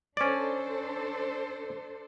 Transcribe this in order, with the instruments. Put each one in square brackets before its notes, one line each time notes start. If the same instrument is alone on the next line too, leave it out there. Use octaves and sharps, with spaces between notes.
[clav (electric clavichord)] C#4 D5 [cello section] D4 A4 C5